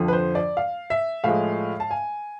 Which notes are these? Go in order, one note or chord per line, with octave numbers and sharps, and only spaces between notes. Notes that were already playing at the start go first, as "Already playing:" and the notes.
Already playing: F2 D3 F3
B4
C5
D5
F5
E5
A2 F3 G#3 F5
A5
G#5